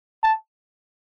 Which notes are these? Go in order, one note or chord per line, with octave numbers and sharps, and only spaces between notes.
A5